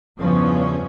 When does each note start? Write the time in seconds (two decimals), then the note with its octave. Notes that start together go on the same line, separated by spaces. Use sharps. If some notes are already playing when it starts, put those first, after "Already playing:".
0.18 E2 G2 C#3 F3 B3 C#4